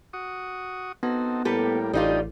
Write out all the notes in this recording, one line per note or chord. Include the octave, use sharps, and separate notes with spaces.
F#4 C#6 D#6
B3 C4 D#4 F#4 A4
A2 G3 A#3 G4 A4 B4
A1 G3 D4 D#4 F4 G4 D#6